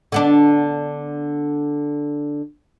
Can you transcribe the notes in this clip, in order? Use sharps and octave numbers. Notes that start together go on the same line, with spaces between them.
D3 B3 D4